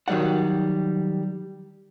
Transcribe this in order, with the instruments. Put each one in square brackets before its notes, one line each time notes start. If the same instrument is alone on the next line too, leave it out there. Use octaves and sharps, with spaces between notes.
[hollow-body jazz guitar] D#3 F#3 G3 D5 F#5